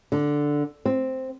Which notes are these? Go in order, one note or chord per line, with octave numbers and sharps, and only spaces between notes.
D3
C4